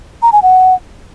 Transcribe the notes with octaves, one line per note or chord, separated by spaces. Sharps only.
A#5
G#5
F#5